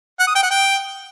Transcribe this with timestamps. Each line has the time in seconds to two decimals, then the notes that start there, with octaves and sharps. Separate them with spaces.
0.20 F#5
0.27 D#6
0.35 G5
0.43 F#5
0.51 G5